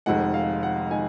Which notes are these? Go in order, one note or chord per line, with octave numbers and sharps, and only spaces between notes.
F1 F2 D#3 G#3 D#4 F#5
F5
F#5
D#3 G#3 D#4 G#5